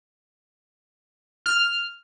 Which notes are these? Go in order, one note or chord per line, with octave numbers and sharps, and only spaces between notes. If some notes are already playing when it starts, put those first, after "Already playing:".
F6